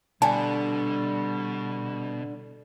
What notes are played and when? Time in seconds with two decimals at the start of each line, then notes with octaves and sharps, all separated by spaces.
0.22 B2 D3 G3 G#5 A5